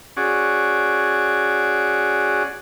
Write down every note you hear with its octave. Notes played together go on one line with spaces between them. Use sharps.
C#4 F#4 G#4 D5